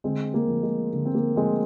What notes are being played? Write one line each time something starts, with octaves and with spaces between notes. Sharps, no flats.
D3 G#3 C4
A#3
F3
G#3
D3
C4
A#3
F3 G#3 C4